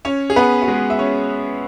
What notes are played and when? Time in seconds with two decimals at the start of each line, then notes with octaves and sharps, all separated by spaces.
0.05 C#4 C#5
0.30 G#4
0.36 B3 B4
0.62 F#4
0.68 G#3 G#4
0.90 E5
0.99 C#4 C#5